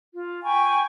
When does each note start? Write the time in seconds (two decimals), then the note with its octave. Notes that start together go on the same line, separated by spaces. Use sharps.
0.12 F4
0.43 G5 G#5 B5 C#6